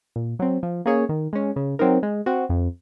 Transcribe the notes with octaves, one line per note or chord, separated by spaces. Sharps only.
A#2
F#3 C4
F3
A#3 C#4 G#4 C#5
D#3
G#3 C#4
C#3
F#3 C4 D#4 A#4
G#3
C4 F#4
F2